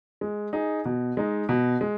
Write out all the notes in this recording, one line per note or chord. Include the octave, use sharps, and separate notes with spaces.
G#3
D#4 G#4
B2
G#3 D#4
B2
G#3